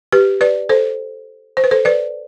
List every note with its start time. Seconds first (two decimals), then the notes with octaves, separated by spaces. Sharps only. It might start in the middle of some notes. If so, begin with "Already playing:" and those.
0.12 G4 B4
0.41 B4 D5
0.69 A4 C5
1.57 C5
1.64 B4
1.71 A4 C5
1.85 B4 D5